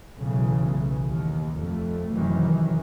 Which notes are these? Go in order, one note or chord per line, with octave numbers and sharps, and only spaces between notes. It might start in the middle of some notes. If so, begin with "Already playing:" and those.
B1 A2 C#3 E3
D#2
F2 A3
F#2 C3 D#3 E3